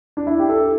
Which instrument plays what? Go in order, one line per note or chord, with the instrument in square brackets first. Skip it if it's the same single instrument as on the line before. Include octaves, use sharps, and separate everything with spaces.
[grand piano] D4
E4
G4
A4